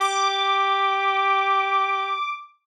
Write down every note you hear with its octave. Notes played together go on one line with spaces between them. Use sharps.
G4 D6